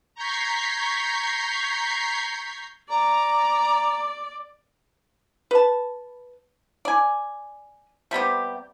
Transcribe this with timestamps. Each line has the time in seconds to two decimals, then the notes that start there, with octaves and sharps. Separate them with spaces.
0.15 A#5 C#6 G6 G#6 B6 C7
2.89 D5 A#5
5.51 B4 A5
6.85 D5 G#5
8.11 C3 G3 B3 G4